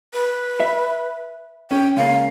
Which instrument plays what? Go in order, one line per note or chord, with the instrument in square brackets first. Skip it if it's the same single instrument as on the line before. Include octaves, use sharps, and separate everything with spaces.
[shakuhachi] B4
[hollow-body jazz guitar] E5
[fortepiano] C#4 [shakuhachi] G5
[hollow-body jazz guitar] C#2 C#3 A#3 [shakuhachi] F5